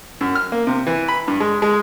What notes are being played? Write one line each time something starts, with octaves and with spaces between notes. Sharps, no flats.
F#2
F6
A#3
C3
E3
B5
G2
G#3
G#3